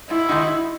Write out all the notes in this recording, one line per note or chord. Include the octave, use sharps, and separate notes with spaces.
G#2 E4
D#3 G#3 D#4 F#4
G#2